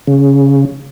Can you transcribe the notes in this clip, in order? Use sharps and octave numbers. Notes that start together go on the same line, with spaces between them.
C#3